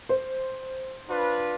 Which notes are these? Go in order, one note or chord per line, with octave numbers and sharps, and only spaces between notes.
C5
D4 F4 B4